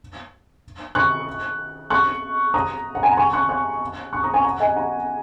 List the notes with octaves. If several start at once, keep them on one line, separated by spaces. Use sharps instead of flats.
C#6 F#6
C#6 F#6
A#5 D#6
F#5
G#5
A#5
G#5 C#6
C#6 F#6
C#6 F#6
C#6 F#6
A#5 D#6
G#5 C#6
F#5 A#5
D#5 G#5
F#5 A#5